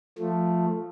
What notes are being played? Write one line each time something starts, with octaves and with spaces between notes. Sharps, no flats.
F3 A3